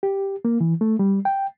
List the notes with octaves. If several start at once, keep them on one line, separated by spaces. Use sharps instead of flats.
G4
A#3
E3
A3
G3
G5